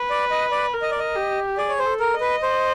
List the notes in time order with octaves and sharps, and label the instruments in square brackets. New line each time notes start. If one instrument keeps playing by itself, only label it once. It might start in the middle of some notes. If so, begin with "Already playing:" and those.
Already playing: [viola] B4
[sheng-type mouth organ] D5
D#5
D5
[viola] A#4
[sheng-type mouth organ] D#5
D5
D#5
[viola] G4
[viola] G#4 [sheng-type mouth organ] D5
[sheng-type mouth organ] C#5
C5
[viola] A4
[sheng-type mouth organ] A#4
[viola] D#5
[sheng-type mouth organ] B4
C5